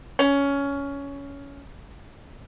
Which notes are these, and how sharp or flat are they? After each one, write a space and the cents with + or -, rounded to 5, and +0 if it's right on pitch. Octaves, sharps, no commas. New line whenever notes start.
C#4 +15